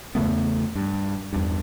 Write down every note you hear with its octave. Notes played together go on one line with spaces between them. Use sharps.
E2 C#3 A3 B3
G2
E2 G2